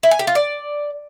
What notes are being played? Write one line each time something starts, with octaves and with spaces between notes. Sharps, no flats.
E4
G#5
G4
F4
D5